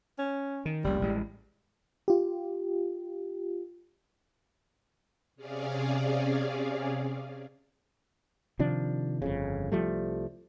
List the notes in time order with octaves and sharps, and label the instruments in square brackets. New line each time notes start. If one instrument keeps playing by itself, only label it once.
[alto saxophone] C#4
[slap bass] D#3
[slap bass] F#1 C#2 [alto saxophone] G3
[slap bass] A1 G#3
[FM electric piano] F4 G4
[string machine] C3 C#4 G#4 D5 F5
[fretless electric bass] C3 D#3 F3 D4
G1 F2 C#3
C2 F3 G3 A3